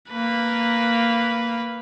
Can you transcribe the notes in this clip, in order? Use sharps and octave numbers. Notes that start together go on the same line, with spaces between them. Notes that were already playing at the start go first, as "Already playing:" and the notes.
A#3 B4